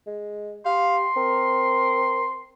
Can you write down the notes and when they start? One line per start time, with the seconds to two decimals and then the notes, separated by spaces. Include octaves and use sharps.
0.07 G#3
0.66 G4 F5 C6
1.16 C4 A#4